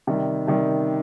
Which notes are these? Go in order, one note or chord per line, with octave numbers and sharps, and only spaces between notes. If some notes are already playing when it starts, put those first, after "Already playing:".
C3 D#3 G3
C3 D#3 G3